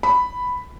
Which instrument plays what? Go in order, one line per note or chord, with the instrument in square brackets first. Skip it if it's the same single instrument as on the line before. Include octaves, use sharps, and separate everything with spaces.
[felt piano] B5